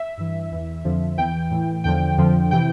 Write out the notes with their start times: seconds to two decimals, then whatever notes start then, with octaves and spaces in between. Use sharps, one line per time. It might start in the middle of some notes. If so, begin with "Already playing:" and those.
Already playing: E5
0.17 G2 E3
0.51 E2 E3
0.84 F2 D3 F3
1.17 E2 E3 G5
1.51 A2 E3
1.84 E2 D3 F3 G5
2.17 F2 D3 F3
2.51 C3 E3 G5